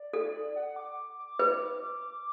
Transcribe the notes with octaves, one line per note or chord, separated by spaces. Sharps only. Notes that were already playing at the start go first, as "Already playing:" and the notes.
Already playing: D5
A4
F#5
D6
D6
B4